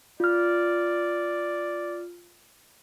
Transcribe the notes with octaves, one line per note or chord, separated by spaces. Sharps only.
F4 D5 F6